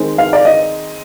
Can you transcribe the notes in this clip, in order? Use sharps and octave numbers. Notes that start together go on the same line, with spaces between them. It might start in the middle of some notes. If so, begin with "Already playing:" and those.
Already playing: D#3 G#3 C4
F5
D5
D#5